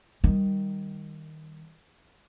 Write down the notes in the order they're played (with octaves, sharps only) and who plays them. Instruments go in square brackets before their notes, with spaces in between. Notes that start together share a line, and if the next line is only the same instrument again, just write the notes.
[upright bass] D#3 G3